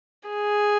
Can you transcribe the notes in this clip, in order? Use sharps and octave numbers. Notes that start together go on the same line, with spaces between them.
G#4